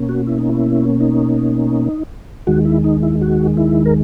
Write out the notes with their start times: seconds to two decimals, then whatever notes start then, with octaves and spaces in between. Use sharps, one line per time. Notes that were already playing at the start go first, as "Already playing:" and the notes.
Already playing: B2 A#3 C#4
0.09 F#4
0.27 E4
0.39 D#4
0.49 E4
1.00 D#4
2.47 D#2 D#3 G#3 F#4
2.65 E4
2.84 D#4
3.03 E4
3.21 F#4
3.57 E4
3.86 A#4